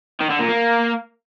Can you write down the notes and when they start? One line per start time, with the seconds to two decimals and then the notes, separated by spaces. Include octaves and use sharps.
0.21 D#3
0.30 D3
0.39 A#2
0.49 A#3